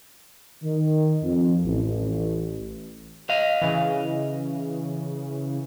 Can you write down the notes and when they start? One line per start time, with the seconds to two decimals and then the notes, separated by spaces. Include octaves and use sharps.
0.63 D#3
1.22 F2
1.66 A1
3.30 D#5 F5
3.62 C#3 E3